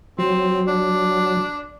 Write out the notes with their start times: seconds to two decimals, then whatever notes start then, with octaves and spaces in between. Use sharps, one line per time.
0.19 F#3 C4
0.67 D4